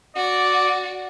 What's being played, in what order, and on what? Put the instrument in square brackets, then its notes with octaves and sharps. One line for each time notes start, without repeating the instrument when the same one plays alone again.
[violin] F#4 [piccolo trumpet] D5